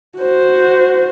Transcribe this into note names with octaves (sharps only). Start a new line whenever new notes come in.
F#4 C5